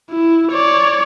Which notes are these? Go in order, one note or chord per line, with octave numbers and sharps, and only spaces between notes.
E4
C#5 D5